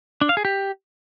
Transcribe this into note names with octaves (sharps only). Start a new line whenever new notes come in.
D4
F5
G#4
G4